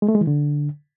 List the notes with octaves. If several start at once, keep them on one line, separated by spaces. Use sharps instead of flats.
G#3
A3
G#3
E3
D3